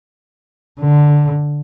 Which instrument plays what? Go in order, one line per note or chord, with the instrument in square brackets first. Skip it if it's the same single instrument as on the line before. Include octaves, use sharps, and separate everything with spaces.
[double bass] D3